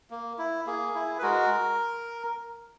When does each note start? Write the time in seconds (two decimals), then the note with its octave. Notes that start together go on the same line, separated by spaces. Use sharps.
0.10 A#3
0.38 E4
0.66 A#3 G#4
0.95 E4
1.18 B4
1.22 G#3 F#4 A#4